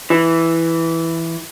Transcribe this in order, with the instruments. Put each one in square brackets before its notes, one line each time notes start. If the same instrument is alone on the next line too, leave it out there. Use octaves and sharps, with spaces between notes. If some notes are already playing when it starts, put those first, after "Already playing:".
[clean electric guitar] E3